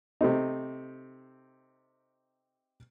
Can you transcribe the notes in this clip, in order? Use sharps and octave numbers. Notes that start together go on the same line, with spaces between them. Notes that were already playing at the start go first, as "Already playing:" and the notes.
C3 A3 C4 D#4